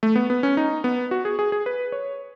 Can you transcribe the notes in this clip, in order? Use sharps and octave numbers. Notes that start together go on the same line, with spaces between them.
A3
B3
B3
C#4
D#4
B3
F#4
G#4
G#4
G#4
B4
C#5